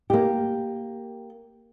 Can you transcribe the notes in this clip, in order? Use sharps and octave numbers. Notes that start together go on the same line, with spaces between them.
A#3 G4